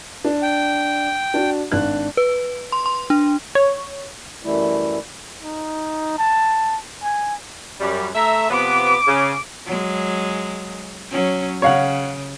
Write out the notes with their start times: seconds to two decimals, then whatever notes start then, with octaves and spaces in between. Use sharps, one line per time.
0.24 D4
0.43 G5
1.34 D4 F#4
1.72 G#1 D4 F#6
2.17 B4
2.72 C6
2.86 C6
3.10 D4
3.55 C#5
4.44 F#2 E3 G3 A3 E4
5.42 D#4
6.18 A5
7.03 G#5
7.80 F#2 G3
8.15 A3 E5 A#5
8.50 C3 F3 B3 D6
9.08 C#3
9.66 F#3 G#3
11.11 F#3 C#4
11.62 C#3 C#5 F5 F#5